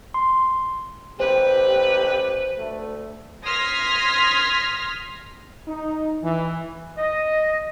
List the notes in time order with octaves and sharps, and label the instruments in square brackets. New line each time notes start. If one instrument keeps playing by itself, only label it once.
[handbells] C6
[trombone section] A1 G4 [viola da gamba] B4 [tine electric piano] C5
[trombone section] D2 A3
[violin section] C6 D#6 F6 G#6 A#6 B6
[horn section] D#4
E3
[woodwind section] D#5